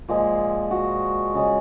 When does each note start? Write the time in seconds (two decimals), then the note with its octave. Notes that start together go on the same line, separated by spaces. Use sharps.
0.08 A#2 F3 G#3
0.71 F#4
1.34 C#3 G#3